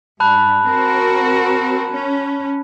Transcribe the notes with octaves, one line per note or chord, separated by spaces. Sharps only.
G2 A5 B5 F#6
C4 F#4 A#4
C#4